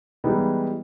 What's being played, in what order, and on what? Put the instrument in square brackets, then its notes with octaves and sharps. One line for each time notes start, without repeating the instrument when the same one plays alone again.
[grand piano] E3 G3 G#3 B3 D#4